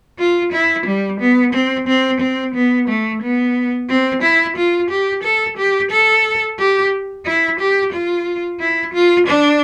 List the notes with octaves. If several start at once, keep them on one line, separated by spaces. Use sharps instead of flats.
F4
E4
G3
B3
C4
C4
C4
B3
A3
B3
C4
E4
F4
G4
A4
G4
A4
G4
E4
G4
F4
E4
F4
D4